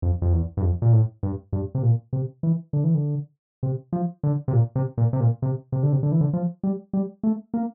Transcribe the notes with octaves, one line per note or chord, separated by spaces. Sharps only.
F2
F2
E2
G2
F2
A#2
A2
G2
G2
C3
A#2
C3
E3
D3
E3
D3
C3
F3
D3
C3
A#2
C3
A#2
C3
A#2
C3
C3
D3
C3
D3
E3
D3
F3
G3
G3
A3
A#3